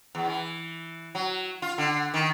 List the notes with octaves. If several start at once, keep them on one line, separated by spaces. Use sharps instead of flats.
E2
E3
F#3
F4
D3
D#3